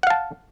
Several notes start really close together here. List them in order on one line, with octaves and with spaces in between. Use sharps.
F#5 F5 A5